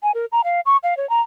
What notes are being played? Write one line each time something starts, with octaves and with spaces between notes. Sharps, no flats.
G#5
A#4
A#5
F5
C#6
F5
C#5
A#5